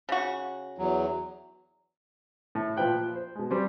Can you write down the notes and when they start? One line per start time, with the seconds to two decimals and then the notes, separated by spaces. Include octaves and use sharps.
0.09 C#3 F#4
0.78 E2 F#3
2.55 A2
2.77 A#2 F3 B4 C5 G5 F#6
3.16 C5
3.35 B2 G#3
3.50 G3 C4 F#4